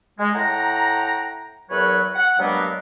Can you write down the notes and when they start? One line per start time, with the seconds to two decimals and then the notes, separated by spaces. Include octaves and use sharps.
0.18 G#3
0.34 A2 F#5 G5 A#5
1.70 E2 F#3 A#4 B4 C#5 F#5
2.14 F#5
2.39 G2 F#3 G#3 A#3 B3